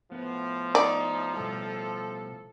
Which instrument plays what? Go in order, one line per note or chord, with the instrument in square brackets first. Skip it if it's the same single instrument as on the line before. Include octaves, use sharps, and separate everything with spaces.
[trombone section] A2 F3 [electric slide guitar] B3 B4
[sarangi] D#4 [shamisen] D5
[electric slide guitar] B2 G3 [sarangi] A4